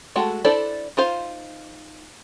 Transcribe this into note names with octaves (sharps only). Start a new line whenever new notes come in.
G#3 A3 F#4 A4
D4 E4 A4 C5 D5
D#4 F4 C5 F5